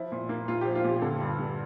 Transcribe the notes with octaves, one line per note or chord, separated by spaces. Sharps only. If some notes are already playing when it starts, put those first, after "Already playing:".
Already playing: F3 E4
A#2
A#3
A#2 F4
F3 G4
F4
A#2 G4
D3 A4
G2
G3